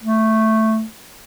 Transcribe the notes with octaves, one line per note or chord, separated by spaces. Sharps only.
A3